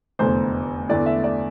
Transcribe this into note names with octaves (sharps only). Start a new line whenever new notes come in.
F1 E2 D3 C5
E2 D3 A3 E4 D5
E5
D5